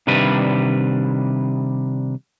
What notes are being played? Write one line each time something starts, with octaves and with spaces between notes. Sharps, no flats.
C3 D#3 G3 D4 B4